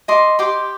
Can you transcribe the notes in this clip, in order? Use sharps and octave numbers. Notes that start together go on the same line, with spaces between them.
D#5 C6 D6
G4 C6 D6